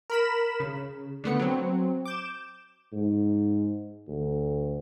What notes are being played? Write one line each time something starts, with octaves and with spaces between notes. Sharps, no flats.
A#4 B5 E7
C#3
D3 A3 B3 C#7
F#3 C4
D6 G6 E7
G#2
D2